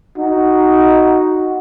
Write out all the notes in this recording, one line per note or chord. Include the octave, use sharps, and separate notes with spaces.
D#4 F#4